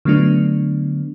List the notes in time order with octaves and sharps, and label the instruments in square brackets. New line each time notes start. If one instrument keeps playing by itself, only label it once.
[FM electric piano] D3 F#3 A3 B3 D4